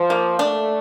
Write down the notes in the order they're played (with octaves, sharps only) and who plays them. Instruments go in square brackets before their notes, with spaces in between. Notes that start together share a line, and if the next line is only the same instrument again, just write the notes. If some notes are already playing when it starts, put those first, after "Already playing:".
Already playing: [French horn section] F3
[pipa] A#3
[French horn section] A3 [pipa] D4